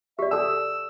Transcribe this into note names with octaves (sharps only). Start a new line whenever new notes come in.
G4 D5 E5
A4 A5 E6